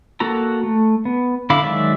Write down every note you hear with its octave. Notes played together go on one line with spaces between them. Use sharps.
A#3 F#4 A4 A#5
A3
B3
D3 E4 F5 B5 D6
D#3 F#3 G#3 D5 E5